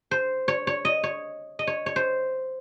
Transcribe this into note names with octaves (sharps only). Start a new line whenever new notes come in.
C5
C#5
C#5
D#5
C#5
D#5
C#5
C#5
C5